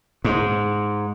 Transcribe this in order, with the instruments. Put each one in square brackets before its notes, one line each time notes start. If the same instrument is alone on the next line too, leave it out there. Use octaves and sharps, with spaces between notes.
[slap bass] G#2